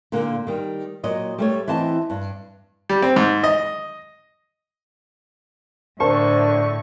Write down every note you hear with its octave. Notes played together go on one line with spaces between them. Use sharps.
A#2 D3 A#3
D#3 G3
A#2 F#3 D#5
G3 A3 C#5
E3 C4 D#5 A5
G2
G3
C4
G#2
D#5
A2 D3 D4 A#4 C5 A5 C#6